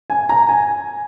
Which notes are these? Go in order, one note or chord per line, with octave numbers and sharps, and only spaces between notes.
G#5
A#5
G#5